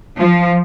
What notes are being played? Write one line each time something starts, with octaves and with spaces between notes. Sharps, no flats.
F3